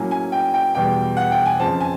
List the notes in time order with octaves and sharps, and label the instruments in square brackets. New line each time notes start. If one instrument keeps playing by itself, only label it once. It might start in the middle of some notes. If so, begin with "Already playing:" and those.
Already playing: [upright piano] A2 F#3 A#3 C#4 G#5
G#5
G5
G5
E2 B2 G3 G5
F#5
G5
G#5
F2 C#3 F3 A5
G#5